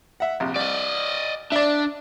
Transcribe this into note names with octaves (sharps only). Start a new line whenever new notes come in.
E5 F#5
A#1 C3
C2 D5 D#5
D4 D5 E5